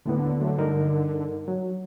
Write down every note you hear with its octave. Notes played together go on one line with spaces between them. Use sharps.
D#2 A2 D3 B3
F#3 A3
G2 D#4 A#4
F#3